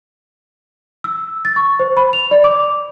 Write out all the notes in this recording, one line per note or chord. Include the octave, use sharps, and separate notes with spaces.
E6
A6
C#6
C5
B5
F7
D5
D6